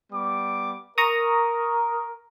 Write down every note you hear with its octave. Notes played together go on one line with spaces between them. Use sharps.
G3 B3 D6
A#4 A#5 C#6 D#6